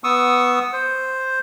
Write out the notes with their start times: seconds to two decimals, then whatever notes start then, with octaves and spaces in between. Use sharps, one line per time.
0.04 B3 C#6 D#6 E6
0.73 C5